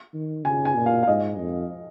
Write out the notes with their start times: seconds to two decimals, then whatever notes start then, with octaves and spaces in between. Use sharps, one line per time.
0.14 D#3
0.44 C#3 G#5
0.65 G#5
0.76 A#2
0.86 F5
1.03 F5
1.07 G#2 D#5
1.39 F2